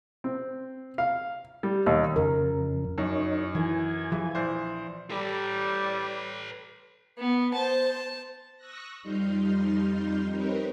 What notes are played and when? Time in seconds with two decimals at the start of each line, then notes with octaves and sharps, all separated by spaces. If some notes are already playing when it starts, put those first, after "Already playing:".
0.24 C4
0.98 F5
1.63 G3
1.86 D#2
2.16 F2 C#3 A#4
2.98 F#2 D#4 C#5
3.55 E3 G#5
4.12 E3 F3
4.35 A#1 E3 C5
5.10 G3 A4 B4
7.18 B3
7.54 C5 A5
8.57 C#6 D#6 E6 F#6 A#6
9.03 F2 G3 D#4 C6 F6 G6
10.29 C4 D#4 G4 A#4 B4 C#5